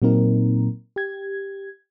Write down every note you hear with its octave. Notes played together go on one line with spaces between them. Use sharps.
A#2 F#3 A#3 C4 D#4 A#4
G4 G#6